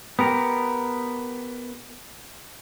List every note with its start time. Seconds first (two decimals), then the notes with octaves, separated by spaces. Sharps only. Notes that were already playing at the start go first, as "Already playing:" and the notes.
0.19 B3 G4 A#4